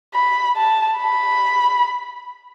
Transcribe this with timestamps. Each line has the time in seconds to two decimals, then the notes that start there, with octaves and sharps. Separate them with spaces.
0.14 B5
0.56 A5
0.98 B5